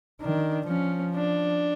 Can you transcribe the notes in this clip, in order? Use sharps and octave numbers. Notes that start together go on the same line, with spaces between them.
D#3 D4
F3 C#4
D4